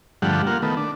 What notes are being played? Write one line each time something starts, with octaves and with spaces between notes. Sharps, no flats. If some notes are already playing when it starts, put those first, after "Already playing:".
G2 D3 F3 G3 A3 F#5
A#3 F4 F#5
D#3 A3 B3
D4